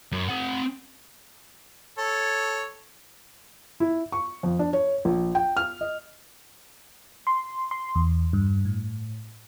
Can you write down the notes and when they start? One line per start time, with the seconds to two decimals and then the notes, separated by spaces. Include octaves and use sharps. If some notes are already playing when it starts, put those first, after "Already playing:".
0.12 F#2
0.28 C4 F#5
1.98 A4 C#5
3.80 E4
4.12 C#6
4.43 F2
4.59 D4
4.73 C#5
5.05 A#1
5.35 G5
5.57 F6
5.81 D#5
7.27 C6
7.71 C6
7.95 E2
8.33 G2
8.65 A2